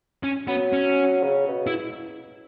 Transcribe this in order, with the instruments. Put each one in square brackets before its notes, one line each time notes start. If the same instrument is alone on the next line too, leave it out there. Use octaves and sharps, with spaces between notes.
[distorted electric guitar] C#4
[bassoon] F#3 [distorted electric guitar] B3
[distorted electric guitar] C#4
[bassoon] C#3
B2
[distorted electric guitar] E4